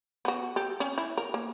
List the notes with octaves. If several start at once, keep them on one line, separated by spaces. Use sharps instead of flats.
B3 F#4
G4 A4
C#4
E4
A#4
A#3